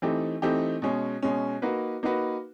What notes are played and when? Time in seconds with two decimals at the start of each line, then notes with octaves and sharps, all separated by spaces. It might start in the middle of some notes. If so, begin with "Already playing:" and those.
0.02 E3 A3 C4 D#4 G4
0.42 E3 A3 C4 D#4 G4
0.82 B2 G#3 C#4
1.22 B2 G#3 C#4
1.62 A#3 D#4 F#4 B4
2.03 A#3 D#4 F#4 B4